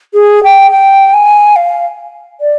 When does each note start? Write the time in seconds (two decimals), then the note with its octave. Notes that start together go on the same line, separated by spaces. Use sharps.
0.14 G#4
0.44 G5
0.71 G5
1.14 G#5
1.56 F5
2.41 D5